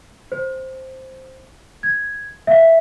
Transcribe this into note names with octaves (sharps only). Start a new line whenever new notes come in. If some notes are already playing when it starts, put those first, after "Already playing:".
C5
G#6
E5 F5